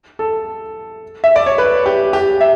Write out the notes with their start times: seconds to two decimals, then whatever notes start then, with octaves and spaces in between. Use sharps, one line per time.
0.19 A4
1.24 E5
1.36 D5
1.46 C#5
1.58 B4
1.86 G4
2.13 G4
2.41 E5